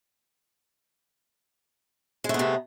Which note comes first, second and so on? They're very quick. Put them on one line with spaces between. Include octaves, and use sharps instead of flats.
G#3 A3 B3 C3